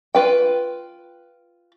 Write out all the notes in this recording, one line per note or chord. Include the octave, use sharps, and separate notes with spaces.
F4 B4 G5